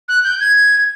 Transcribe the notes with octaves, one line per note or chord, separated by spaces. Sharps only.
F#6
G6
G#6